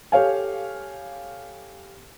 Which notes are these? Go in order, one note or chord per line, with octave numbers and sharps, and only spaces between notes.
G4 A4 C#5 F5 G#5